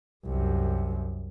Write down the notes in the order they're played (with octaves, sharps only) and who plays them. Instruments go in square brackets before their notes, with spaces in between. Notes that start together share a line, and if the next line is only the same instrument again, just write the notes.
[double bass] C2 F#2